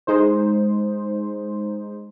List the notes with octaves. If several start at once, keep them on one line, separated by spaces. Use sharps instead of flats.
G#3 D#4 C5